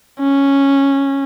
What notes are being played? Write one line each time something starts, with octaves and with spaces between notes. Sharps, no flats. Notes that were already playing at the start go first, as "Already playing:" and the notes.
C#4